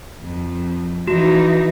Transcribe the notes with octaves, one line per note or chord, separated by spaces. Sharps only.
F2
E3 D#4 F#4 E7